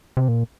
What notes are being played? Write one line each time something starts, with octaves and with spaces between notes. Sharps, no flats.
C3
A#2